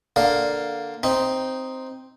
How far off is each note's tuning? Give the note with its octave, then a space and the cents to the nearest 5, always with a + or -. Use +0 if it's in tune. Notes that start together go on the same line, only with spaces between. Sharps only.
D3 +0 A#3 +0 F5 +0
C4 +0 D#4 +0